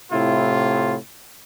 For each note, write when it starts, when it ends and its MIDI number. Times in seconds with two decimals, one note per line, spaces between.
0.12 0.97 45
0.12 0.97 48
0.12 0.97 64
0.12 0.97 65